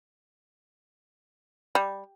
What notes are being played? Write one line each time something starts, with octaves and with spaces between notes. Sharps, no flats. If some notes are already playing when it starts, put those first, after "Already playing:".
G3